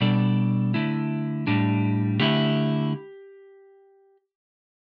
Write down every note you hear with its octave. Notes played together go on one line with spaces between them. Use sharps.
B2 G3 D4 A4 D5
D3 A3 E4
A2 G3 D4
D3 A3 E4 G4